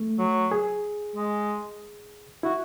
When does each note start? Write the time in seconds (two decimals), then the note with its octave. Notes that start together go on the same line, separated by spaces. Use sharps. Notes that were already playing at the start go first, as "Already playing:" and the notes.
Already playing: A3
0.19 F#3
0.51 G#4
1.16 G#3
2.43 E4 F#4